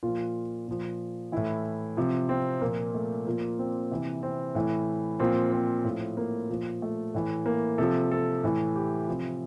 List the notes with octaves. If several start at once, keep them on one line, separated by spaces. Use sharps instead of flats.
A#2 F3 F4
A#2 F3
A2 E3 E4
C3 F3
C4
A#2 F3 A#3
A3
A#2 F3 A#3
C4
C3 E3
C4
A2 E3
A#2 F3 C4
C4
A2 F3
A#3
A#2 F3
A3
A2 E3
A#3
C3 F3 A4
A4
A2 E3
G4
C3 F3